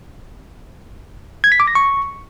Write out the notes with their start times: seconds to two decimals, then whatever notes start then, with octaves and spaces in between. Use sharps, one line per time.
1.44 G#6
1.52 B6
1.60 D6
1.68 A#6
1.75 C#6